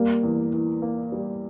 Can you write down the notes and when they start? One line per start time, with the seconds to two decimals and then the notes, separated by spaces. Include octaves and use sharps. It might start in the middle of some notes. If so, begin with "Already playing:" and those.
Already playing: G3 A#3
0.23 E2
0.53 E3
0.82 A#3
1.12 G3